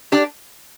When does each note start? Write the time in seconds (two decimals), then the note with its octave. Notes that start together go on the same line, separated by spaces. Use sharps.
0.12 D4 G4 D5